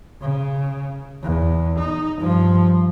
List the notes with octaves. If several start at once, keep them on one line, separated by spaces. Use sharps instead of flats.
C#3
E2
D#4
G2 F3